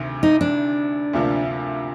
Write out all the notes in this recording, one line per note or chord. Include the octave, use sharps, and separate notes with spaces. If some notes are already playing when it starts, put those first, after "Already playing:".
Already playing: D2 C3 D#3
D#4
D4
D2 C3 F3 A#3